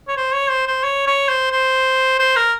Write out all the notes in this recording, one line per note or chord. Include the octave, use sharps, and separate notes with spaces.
C#5
C5
C#5
C5
C5
C#5
C#5
C5
C5
C5
A#4